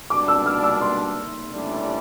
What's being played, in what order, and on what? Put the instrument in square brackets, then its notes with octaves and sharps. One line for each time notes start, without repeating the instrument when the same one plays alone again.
[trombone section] B2 G3 D4 [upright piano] D6
[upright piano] E6
F6
E6
C6
[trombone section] A1 A2 E3 G3 D4